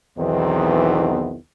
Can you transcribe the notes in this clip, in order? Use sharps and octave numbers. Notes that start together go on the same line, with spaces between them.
B1 E2 D#3 E3 B3 C4